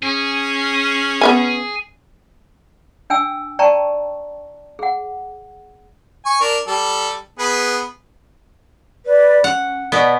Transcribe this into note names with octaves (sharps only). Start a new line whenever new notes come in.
C#4 G#4
B3 E5 G#5
D4 G5 G#5 E6
D5 G5 A5 A#5 C#6
G#4 F#5
G#5 C#6
D4 A#4
G3 A4
B3 G#4 B4
B4 D5
C#4 F#5
B2 B3 D5